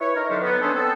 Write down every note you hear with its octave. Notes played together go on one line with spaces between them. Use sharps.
E4 B4 C#5
D#4 A#4
D3 F#3 D4 G4 C5
B3
C#4 D4 G#4 A4 C5
B3 C4 A4